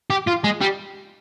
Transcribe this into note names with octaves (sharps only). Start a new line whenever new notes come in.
G4
F4
G#3
G3